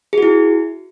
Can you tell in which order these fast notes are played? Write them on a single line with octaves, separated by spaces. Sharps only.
G#4 F#4 E4